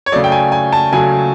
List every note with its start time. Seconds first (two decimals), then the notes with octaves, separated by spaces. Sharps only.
0.06 C#5
0.12 C#3 F#3 A3 D5
0.24 G5
0.32 G#5
0.52 G#5
0.73 A5
0.92 C#3 F#3 A3 G#5